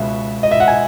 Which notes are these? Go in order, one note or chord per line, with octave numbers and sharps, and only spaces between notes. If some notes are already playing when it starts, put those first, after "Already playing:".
Already playing: C#2 B2 E5
D#5
E5
F#5
G#5